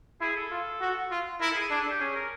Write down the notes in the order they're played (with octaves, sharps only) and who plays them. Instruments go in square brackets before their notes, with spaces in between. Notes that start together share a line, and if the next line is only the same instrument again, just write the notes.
[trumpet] E4 [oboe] G#4
[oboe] A4
[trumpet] F4
F#4
F4
[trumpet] E4 [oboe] A#4
[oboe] A4
G#4
[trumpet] D4 [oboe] G#4
[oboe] A4
G4
[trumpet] C#4 [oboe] G#4
[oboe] A#4